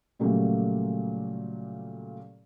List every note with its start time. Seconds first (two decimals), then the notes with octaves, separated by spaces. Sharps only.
0.19 A#2 C#3 F#3 G3 A3 A#3